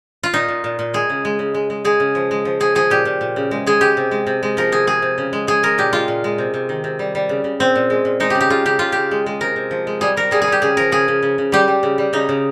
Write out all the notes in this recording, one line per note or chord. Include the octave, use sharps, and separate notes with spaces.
F4
A#2 D#4
A#2
A#2
A#2
G#3 G#4
C#3
G#3
C#3
G#3
G#3
G#3 G#4
C#3
F3
G#3
F3
F3 G#4
F3 G#4
A#2 G4
A#2
A#2
C#3
G#3
G#3 G#4
G#3 G4
C3
G#3
C3
G#3
F3 A#4
C3 G#4
C3 G#4
C3
C#3
G#3
G#3 G#4
G#3 A#4
A#2 G4
G#3 F4
A#2
G#3
C3
C3
D#3
C3
G3
G3
C#3
C#3
A#2 C4
A#2
G#3
A#2
G#3 D#4
C#3 G4
G4
C#3 F4
C#3 G4
C#3 F4
C#3 G4
G#3
G#3
C3 A#4
C3
F3
G#3
G3 G#4
G3 A#4
G3 G#4
G#4
G3 G4
C#3 G#4
F3 A#4
C#3 G#4
C#3
C#3
C#3
G3 G4
G3
C#3
G3
C#3 D#4
C#3